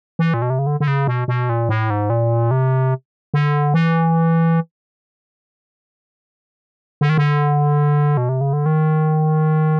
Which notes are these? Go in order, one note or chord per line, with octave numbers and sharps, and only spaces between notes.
E3
A#2
B2
C3
C#3
D3
D3
C#3
B2
B2
A#2
A2
G#2
A#2
C3
D3
E3
D3
D#3
D3
B2
C3
C#3
D3
D#3